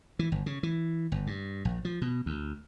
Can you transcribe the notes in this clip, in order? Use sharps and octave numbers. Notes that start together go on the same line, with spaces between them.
E3
G1
C#3
E3
G1
G2
A#1
F3
B2
D2